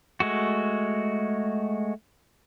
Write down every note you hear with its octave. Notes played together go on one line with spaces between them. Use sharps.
G#3 A3 F#4